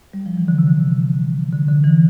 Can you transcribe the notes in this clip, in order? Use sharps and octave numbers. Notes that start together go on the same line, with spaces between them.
G3
F3
E3
D3
C3
D3
D3
D3
E3